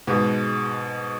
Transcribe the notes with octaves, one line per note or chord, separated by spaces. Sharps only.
G#2 B2